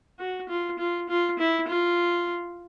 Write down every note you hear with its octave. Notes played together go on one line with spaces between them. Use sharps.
F#4
F4
F4
F4
E4
F4